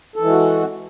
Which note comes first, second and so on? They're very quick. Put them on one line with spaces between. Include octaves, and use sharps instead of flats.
A4 E3 G#3 F#4